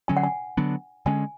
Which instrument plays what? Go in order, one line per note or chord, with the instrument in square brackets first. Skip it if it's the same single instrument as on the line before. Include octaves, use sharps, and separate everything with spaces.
[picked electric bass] D3 F#3 C#4 [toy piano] G#5
[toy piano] F#5
G#5
[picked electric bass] D3 F#3 B3 D4
[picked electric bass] D3 G#3 C#4 [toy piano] G#5